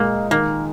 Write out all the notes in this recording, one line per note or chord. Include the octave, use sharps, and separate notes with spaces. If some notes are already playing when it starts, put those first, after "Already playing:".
Already playing: A#2 G#3 A#3 D#4
D#3 A#3